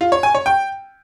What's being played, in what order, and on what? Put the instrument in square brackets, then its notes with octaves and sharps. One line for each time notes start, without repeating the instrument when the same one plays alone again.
[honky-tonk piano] F4
C#5
G#5
C#5
G5